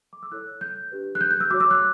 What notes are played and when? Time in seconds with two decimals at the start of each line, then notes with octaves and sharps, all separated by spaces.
0.13 D6
0.23 E6
0.32 E4 A4 C#5 F#6
0.61 G6
0.91 D4 G4 B4
1.15 F#6
1.21 G6
1.31 G6
1.41 E6
1.51 F#4 C#5 D6
1.60 E6
1.71 F#6